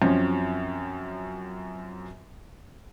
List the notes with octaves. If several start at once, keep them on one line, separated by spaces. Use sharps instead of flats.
F#2 F3 C4 C#4